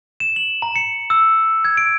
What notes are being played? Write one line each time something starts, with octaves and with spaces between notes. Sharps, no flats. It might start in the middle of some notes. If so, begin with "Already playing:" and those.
E7
F#7
A#5
C#7
E6
G#6
D7